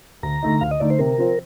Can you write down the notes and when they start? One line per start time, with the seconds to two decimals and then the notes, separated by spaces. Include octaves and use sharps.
0.23 D2 A#5
0.43 D3 A3 D#4
0.61 D2 F5
0.71 D#5
0.80 D3 A3 D#4 D5
0.90 C5
0.99 C3 A#4
1.18 F3 C4 F4 C5